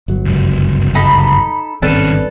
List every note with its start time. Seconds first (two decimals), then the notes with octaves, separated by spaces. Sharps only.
0.08 G1 F#3
0.25 C#2 F#2
0.95 D#4 A4 B5
1.82 G#1 G2 D#3 C4 C#4 A4 B4 D5